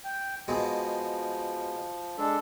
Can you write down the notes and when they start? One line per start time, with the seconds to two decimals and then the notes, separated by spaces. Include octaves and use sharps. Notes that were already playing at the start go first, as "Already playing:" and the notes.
0.04 G5
0.48 B2 F3 G#3
2.18 G#3 D4 A4